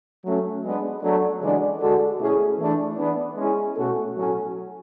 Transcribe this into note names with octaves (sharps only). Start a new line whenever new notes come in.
F#3 A3 C#4
G#3 B3 D4
F#3 A3 D4
C#3 E3 G#3 D4 F#4
D3 G#3 D4 F#4 A4
B2 A3 C#4 E4 G#4
E3 A3 D4
E3 B3 D4
G#3 C#4 E4 G#4
B2 A3 C#4 F#4 A4
A2 F#3 C#4 F#4 A4